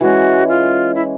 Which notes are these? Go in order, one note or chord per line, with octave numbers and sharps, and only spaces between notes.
E3 G#3 C#4 F#4
F4
E4